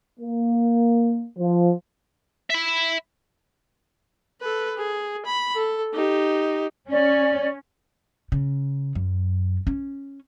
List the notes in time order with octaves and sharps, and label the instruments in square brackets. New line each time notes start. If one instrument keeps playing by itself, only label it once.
[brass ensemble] A#3
F3
[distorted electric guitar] E5 B5
[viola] A4 B4
G#4
B5
A4
D#4 G4
[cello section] C#4 [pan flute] D5
[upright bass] C#3
F#2
C#4